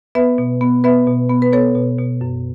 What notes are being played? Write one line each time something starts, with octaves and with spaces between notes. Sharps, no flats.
B3 B4 E5
B2
B3
B3 B4 E5
B2
B3
B4
B3 A4 C#5
B2
B2
F#2